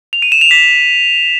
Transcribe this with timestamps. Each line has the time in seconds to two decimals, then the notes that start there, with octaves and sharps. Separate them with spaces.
0.13 F7
0.22 D#7
0.32 E7
0.41 F7
0.51 B6